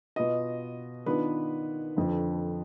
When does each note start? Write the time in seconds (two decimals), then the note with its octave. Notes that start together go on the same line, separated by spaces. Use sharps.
0.16 B2 B3 F4 D#5
1.06 D#3 B3 D4 F4 B4
1.97 F2 D3 F3